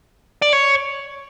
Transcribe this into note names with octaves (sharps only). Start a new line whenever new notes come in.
D5
C#5